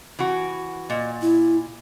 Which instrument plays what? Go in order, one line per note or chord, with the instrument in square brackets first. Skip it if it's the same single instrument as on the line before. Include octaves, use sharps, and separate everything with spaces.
[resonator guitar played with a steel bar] E3 F#4
[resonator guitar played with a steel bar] A#2 [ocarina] D#5
[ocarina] E4